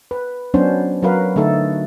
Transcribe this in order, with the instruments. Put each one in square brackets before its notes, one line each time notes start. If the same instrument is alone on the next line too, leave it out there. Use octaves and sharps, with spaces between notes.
[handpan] B4
F#3 B3 C#4 D4 C5
F#3 F#4 A#4 B4 F5
D3 A3 D#4 A4